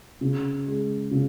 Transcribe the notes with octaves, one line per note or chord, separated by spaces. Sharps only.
C#3
G#3
C#3